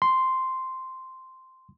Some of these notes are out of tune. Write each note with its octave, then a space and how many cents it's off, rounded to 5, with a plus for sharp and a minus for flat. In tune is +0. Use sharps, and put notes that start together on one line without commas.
C6 -5